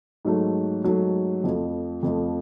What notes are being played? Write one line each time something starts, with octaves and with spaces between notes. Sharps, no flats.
G#2 F#3 A3
G#2 F#3 A3
F2 F3 A3
F2 F3 A3